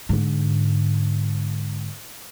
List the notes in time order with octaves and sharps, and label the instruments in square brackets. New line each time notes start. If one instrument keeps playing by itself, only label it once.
[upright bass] G#2 D3